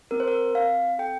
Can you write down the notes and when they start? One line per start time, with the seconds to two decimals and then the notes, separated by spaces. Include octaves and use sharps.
0.11 C4 A#4
0.20 C5
0.28 A#4
0.55 C4 F5
0.99 A4 G5